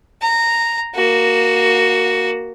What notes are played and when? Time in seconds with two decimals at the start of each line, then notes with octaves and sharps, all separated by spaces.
0.22 A#5
0.94 A#3 F#4